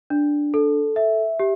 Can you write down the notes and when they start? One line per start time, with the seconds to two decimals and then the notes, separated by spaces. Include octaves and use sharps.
0.10 D4
0.54 A4
0.96 E5
1.39 G4